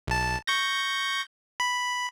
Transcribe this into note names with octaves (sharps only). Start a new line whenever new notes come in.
B1 A5
C#6 G6 A#6
B5